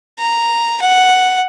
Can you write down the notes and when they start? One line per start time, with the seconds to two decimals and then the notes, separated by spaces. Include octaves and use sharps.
0.19 A#5
0.82 F#5